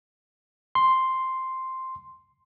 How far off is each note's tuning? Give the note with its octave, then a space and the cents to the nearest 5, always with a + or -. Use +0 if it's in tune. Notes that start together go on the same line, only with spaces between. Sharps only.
C6 +0